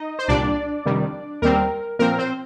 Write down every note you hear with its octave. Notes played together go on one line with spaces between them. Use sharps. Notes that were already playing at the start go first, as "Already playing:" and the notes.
Already playing: D#4 D#5
C5
C2 A#2 G3 D4 D5
F2 C3 D#3 G3
D#2 D#3 G3 C4 A#4
A#2 F3 C4 A#4
C4 C5